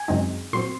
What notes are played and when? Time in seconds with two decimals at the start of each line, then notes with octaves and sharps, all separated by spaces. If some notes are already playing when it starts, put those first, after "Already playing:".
Already playing: G#5
0.08 F#2 C#3 G#3 C4 D#4
0.53 A#2 F#3 C4 C6